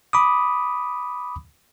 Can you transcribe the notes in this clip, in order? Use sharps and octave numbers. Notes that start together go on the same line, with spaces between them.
B5 D6 D#6